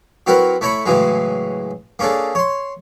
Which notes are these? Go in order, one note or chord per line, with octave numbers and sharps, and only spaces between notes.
F#3 C4 E4 F#4 A#4 B4
A3 E4 C#5 A#5 B5 C#6
A2 C#3 E3 F#3 G#3
A#3 C#4 D4 G#4 A4
C#5 C6